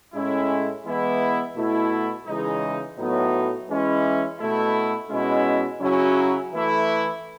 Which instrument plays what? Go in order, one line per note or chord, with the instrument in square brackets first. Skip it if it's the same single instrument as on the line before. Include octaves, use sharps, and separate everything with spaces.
[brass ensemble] A2 G#3 C#4 E4
E3 G#3 B3 E4
B2 A3 E4
C#3 E3 G#3 D#4
A2 F#3 B3 D#4
E3 G#3 C#4 E4
B2 A3 E4
B2 G#3 C#4 E4
C#3 F#3 C#4 E4
E3 A3 E4